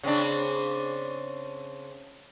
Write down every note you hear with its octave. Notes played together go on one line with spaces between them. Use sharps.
C#3 C4 D4